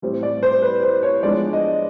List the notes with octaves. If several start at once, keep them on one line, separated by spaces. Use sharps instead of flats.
A2 E3 G3 C4
D5
C5
B4
C5
C#5
F3 G#3 B3 D4 D5
D#5